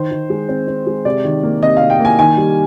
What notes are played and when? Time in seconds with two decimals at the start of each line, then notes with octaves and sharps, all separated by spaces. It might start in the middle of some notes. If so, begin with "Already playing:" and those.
Already playing: D#3 C5
0.11 D#3
0.30 G#3
0.49 C4
0.68 C4
0.87 G#3
1.05 C3 D5
1.25 D#3
1.43 A#3
1.62 C3 D#5
1.77 C3 F5
1.90 G5
1.99 A#3
2.05 G#5
2.18 D#3 G#5
2.37 G3